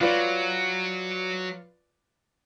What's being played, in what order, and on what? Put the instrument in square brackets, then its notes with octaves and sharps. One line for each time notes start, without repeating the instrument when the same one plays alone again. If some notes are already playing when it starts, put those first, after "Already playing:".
[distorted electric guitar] F#3 [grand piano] F4 B4 D5